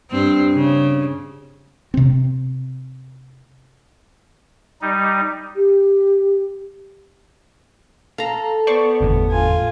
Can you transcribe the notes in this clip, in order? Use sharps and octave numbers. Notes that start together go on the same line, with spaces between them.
G2 C4
C#3
C3 C4
G3 D#4
G4
A4 F5 A#5
B3 C5 D5 C#6
G1 E2 A2
F4 G#5